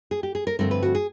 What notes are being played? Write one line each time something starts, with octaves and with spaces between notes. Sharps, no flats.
G#4
G4
G#4
A#4
G2 D3 F3 A3 C4 A#4
B4
F#4
G#4